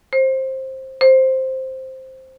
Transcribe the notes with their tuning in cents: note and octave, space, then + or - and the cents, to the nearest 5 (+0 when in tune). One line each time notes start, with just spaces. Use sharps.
C5 +15
C5 +5